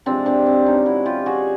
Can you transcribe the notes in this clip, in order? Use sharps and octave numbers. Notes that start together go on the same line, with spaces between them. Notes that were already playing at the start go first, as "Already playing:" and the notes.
C3 F3 G#3 C4 D4
C4 D4
C4
C#4 D#4
E4 F#4
F4 G4
F#4 G#4